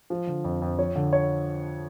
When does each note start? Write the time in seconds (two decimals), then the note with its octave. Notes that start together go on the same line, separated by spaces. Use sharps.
0.10 F3
0.27 D3
0.44 F2
0.62 F2
0.79 F3 C#5
0.96 D3
1.13 C#5